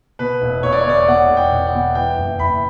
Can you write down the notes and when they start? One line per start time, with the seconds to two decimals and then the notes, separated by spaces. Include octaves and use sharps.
0.19 B2 B4
0.42 E1
0.63 E1 C#5
0.72 D5
0.81 C#5
0.86 E2 D5
0.97 C#5
1.08 B2 F#5
1.30 E1
1.37 G5
1.51 E1
1.67 F#5
1.74 E2
1.95 E3 G5
2.18 F#1
2.39 F#1 B5